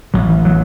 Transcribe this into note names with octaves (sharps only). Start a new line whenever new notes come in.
A1 A2 F#3
E3
F#3